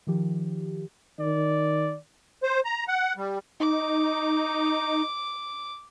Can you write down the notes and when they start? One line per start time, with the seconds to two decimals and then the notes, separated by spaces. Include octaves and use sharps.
0.07 D#3 F3 G4
1.20 D#3 D5
2.43 C5
2.65 A#5
2.88 F#5
3.17 G3
3.60 D#4 D6